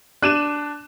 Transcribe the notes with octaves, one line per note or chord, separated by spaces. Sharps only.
D4 F#6 D#7 E7